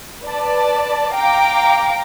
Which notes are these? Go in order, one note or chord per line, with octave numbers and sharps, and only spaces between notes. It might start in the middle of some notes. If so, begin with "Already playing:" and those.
B4 D5 A5
F5 G5 A#5 D6